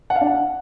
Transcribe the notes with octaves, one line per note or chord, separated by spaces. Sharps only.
F#5
F5
D4
F#5